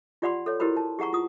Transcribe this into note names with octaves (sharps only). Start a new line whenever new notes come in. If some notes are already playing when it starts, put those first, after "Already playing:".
F4 G4 D5 F#5 B5 C6
A4 C#5
E4 F#4 G4 A#4 C5 B5
A5
G4 G#4 F#5 A#5 C#6
F4 D#6